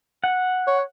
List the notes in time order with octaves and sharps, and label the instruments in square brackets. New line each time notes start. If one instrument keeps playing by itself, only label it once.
[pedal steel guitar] F#5
[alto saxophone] C#5